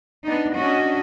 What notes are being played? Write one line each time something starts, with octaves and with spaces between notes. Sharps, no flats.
B3 D4 D#4
C#4 D4 F#4 D#5